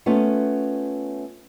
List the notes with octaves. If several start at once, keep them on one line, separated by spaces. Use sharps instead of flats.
A3 B3 C#4 F4